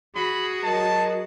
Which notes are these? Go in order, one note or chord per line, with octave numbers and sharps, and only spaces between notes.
F#4 G#4 B5
F#3 A#4 D#5 A5